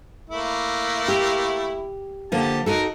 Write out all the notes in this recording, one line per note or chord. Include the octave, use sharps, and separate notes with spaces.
A3 A#3 E4
G4
D3 F3 A#3 G4 A5
D#4 F#4 A4 A#4